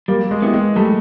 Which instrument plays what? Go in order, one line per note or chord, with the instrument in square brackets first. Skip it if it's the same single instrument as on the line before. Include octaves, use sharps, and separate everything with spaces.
[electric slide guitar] G3 [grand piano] A#3
[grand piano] G#3
[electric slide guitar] B3 E4 G4
[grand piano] G#3
[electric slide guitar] G3 [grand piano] A3